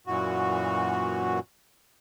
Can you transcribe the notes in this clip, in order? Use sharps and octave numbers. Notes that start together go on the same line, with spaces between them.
F#2 A#2 E3 F#4